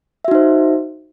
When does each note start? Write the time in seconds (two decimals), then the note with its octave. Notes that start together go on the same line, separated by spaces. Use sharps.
0.25 E5
0.28 F#4
0.31 D#4
0.35 C5